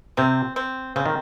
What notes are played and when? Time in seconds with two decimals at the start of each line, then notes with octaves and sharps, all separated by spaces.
0.17 C3 C4
0.56 C4
0.96 C#3 C4
1.06 D#3